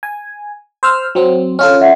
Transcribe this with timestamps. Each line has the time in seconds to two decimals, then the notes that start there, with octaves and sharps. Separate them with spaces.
0.03 G#5
0.83 C5 E6 F6
1.15 F#3 C4
1.59 C#4 F4 A4 F6
1.81 E5 F#5